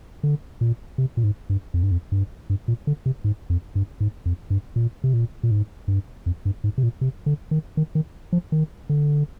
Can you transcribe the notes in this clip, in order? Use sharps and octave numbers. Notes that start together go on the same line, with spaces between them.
D3
A#2
C3
A#2
G#2
G2
F2
G2
F2
G2
G2
A#2
D3
C3
G#2
F2
G2
G#2
F2
G2
A#2
C3
A#2
A#2
G#2
G2
F2
G2
G#2
C3
A#2
C3
D3
D#3
D#3
D#3
F3
D#3
D3